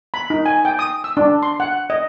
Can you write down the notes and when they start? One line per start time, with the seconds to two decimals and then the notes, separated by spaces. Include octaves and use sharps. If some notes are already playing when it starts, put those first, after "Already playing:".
0.14 B5
0.30 D#4
0.46 G#5
0.65 G5
0.79 D#6
1.04 E6
1.17 D4
1.43 C6
1.60 F#5
1.90 D#5